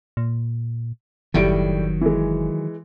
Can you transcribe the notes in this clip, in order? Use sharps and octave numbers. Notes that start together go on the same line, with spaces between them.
A#2
F#1 A2 D#3 F#3 G3 D7
E3 G#3